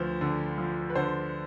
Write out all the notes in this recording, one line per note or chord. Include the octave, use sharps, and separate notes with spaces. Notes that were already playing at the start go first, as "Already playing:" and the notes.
Already playing: D2 F3 B4 C5
D3
F3
B4
D3 C5